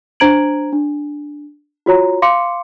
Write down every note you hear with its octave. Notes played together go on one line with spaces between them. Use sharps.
D4 C5 A#5 G#6 D7 F#7
D4
F4 F#4 C#5 A#5
F5 C6 D6 C#7